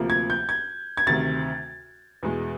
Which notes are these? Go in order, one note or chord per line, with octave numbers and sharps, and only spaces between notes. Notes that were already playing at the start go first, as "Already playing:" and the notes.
Already playing: D2 C3 F3 A#3
G#6
G6
G#6
G#6
D2 C3 D#3 A6
E2 B2 G#3